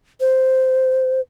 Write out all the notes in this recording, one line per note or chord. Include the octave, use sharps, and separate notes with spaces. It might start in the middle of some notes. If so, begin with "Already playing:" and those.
C5